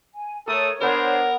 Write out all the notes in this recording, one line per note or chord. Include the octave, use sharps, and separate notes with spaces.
G#5
A3 A4 A#4 C#5 D#6
B3 D4 A#4 C5 D#6